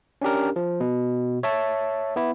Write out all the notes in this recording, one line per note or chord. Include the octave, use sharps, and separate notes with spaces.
C#4 D4 G4 A#4
F3
B2
C#5 E5 A5
B3 E4